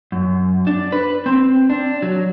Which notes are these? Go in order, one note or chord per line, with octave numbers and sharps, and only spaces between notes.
F#2
D4
B4
C4
D4
F#3